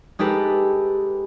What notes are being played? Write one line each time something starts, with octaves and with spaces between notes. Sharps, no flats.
G#3 D#4 G4 A4 B4